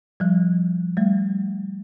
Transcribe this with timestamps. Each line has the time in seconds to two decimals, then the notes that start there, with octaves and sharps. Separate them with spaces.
0.20 F3 G3
0.97 G3 A3